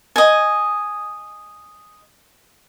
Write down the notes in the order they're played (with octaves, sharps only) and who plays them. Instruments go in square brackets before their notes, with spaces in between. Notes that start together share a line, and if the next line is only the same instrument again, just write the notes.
[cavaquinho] D#5 G#5